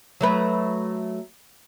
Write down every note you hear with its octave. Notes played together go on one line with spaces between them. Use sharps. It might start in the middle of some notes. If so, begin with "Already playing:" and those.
F#3 A3 B4